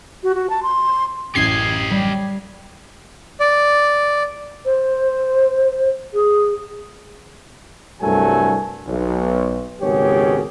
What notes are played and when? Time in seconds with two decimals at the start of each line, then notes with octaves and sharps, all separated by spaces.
0.23 F#4
0.34 F#4
0.49 A5
0.63 C6
1.35 A1 F#2 G4 D#5 G#6 C7
1.91 G3
3.40 D5
4.65 C5
6.13 G#4
8.02 C2 G2 F#3 A3 A4 G#5
8.87 B1
9.81 G#1 C#2 B2 G4 G#4 C#5